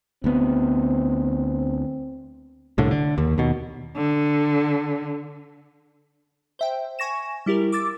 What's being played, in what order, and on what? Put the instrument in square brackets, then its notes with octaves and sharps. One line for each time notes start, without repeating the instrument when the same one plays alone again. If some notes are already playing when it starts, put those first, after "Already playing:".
[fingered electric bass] D2 B3 [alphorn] C4
[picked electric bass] C2 A2 D3
D3
D#2
D#2 B2
[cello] D3
[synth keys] C5 E5 G5
G#5 C#6 A#6 E7
G3 E4 G4 A#4
D6 E6 A6